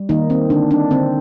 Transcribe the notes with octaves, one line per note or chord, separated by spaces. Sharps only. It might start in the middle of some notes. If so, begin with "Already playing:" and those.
Already playing: G3
D#3 A#3 D#4
C4
D3 D4
D4
D3 C4